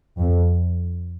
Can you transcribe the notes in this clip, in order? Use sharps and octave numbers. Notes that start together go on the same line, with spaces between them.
F2